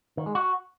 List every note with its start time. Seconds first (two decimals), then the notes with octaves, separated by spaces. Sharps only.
0.17 D#3
0.26 G#3
0.35 F#4